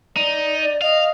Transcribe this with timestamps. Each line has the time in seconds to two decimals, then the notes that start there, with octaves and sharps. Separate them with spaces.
0.17 D#4 D5
0.82 D#5 F5